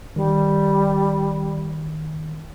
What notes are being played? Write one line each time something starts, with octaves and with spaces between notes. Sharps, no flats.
D#3 G3